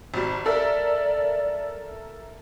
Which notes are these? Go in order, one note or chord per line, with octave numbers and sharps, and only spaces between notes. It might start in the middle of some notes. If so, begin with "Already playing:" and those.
G#1 G3
A4 A#4 D5 E5